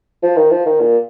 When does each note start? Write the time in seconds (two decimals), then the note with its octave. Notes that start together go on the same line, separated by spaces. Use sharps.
0.23 F3
0.36 D#3
0.51 F3
0.66 D#3
0.80 A#2